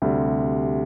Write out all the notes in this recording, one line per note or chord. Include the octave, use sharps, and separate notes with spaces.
D2 C3 G3